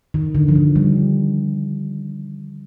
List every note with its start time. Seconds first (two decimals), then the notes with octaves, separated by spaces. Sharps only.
0.14 D#3
0.35 D3
0.48 F3
0.55 D#3
0.76 G3